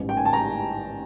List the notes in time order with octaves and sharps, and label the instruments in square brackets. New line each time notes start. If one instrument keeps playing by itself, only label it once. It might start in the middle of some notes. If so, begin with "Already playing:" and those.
Already playing: [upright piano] A1 G#2 E3 G3
G5
G#5
A5
A#5